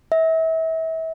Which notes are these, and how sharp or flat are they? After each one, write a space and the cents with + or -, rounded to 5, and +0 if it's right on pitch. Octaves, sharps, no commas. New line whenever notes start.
E5 -30